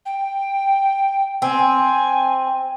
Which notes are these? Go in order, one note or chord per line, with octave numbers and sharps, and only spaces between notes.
G5
C4 G#5